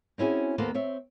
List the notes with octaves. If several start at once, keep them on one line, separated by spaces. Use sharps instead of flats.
C4 C#4 E4 F#4 G#4
D#2 A#3 B3 A4 B4 C5
C4 C#5 E5